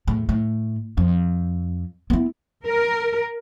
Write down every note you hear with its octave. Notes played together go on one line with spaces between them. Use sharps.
E2 A2
A2
F2
B3 E4
A#4